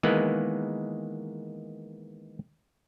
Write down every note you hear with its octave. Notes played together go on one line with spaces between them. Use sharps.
D#3 E3 G#3 A#3 B3